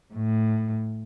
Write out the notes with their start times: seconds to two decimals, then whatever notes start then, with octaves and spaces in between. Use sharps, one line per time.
0.14 A2